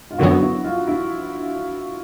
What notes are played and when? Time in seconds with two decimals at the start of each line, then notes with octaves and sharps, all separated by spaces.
0.11 F4
0.18 F#2 D3 F#3 B3 F#4
0.42 E4
0.64 F4
0.87 E4